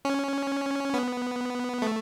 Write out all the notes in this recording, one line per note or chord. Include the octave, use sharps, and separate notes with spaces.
C#4
B3
A3